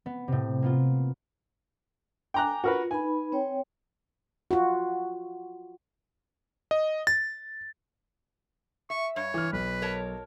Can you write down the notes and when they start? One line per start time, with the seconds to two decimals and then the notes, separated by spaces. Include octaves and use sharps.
0.06 B3
0.28 A2 C3
0.62 A#3 B3 F4
2.34 G5 G#5 A#5 D6 F#6
2.64 F4 F#4 A#4 B4
2.91 D#4 B4 G#5 B5
3.32 C4 C#5 G5
4.51 F4 F#4
6.71 D#5
7.07 A6
8.90 E5 C#6
9.16 G2 C#5
9.34 E3 F6
9.53 B1 B4
9.82 A#4 C#5 A5